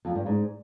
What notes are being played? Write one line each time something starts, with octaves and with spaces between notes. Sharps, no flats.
F2
G2
G#2